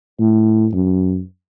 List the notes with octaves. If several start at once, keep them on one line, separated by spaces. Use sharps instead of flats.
A2
F#2